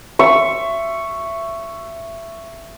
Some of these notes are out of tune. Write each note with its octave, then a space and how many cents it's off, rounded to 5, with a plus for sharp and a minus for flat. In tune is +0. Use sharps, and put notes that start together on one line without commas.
E5 +20 C#6 +0